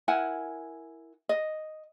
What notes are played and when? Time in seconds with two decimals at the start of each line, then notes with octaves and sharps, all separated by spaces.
0.08 E4 A#4 F#5 G#5
1.29 D#5